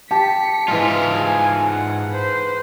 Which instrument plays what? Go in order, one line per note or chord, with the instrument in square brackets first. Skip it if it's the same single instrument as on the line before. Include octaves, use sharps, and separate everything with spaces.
[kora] G4 [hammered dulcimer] A5 [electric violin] B6 C#7
[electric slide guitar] G#2 F4 [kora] E3 G#3
[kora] G#4 [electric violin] G#5
[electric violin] F#5
B4 C5